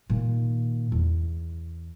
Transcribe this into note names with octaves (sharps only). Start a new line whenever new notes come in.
A#2 D#3
E2